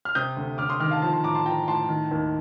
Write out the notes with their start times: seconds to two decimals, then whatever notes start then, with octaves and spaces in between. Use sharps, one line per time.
0.05 F6
0.15 C3 D#6 G6
0.37 D2
0.58 D2 D6 F6
0.69 C6 D#6
0.80 D#3 D6 F6
0.91 F5 A5
1.02 F3 A5 C6
1.13 A5 C6
1.24 A2 A#5 D6
1.35 A5 C6
1.45 F3 G5 A#5
1.67 A2 A5 C6
1.89 D#3
2.11 D#2